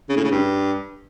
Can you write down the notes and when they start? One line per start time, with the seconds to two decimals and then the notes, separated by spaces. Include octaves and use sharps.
0.09 C#3
0.16 A2
0.24 C#3
0.31 G2